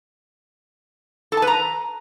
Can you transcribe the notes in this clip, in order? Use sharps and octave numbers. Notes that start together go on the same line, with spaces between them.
A4
A5
B4
A#5